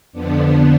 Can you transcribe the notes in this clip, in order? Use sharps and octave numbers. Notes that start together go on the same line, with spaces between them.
F2 D3 F3 B3 D4